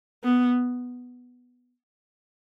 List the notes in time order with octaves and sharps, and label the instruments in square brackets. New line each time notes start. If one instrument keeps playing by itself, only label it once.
[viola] B3